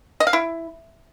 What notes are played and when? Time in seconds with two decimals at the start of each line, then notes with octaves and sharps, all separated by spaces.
0.20 D#5
0.27 F5
0.33 E4